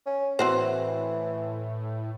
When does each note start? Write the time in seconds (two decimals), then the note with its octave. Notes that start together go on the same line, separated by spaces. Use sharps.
0.06 C#4
0.39 A2 E3 C4 F#4 C5